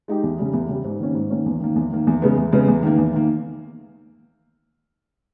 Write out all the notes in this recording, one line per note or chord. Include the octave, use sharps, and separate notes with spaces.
G#3 D#4 G4
E2
C#3 G3
E2
C#3 G3
G#2
D#3 A#3 C#4
G#2
D#3 A#3 C#4
E2
D#3 A#3
E2
D#3 A#3
E2
C#3 G#3 B3
E2
C#3 G#3 B3
E2
D#3 A#3
E2
D#3 A#3